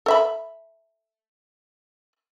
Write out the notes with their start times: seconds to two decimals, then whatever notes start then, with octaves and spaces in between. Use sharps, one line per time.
0.06 A4 E5 B5